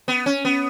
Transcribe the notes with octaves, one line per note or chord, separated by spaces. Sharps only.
B3
C#4
B3